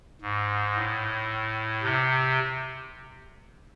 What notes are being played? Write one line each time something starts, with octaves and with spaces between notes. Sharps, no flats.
G#2
A2
C3